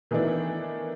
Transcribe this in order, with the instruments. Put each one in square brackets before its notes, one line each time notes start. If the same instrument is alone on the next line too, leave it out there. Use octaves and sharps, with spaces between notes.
[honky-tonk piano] D#3 E3 A3 B3 D4 E4